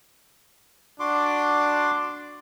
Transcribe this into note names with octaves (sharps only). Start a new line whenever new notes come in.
D4 F#4 C6 D6